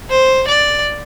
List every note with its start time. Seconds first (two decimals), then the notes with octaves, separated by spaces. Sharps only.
0.10 C5
0.48 D5